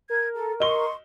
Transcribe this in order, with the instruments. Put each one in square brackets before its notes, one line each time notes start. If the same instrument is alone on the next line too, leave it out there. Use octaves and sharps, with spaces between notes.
[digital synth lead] A#4 [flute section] G#6
[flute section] A4
[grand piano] D#5 G7 [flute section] C6 C#6